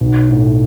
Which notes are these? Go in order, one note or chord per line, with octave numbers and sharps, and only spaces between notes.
B1
A2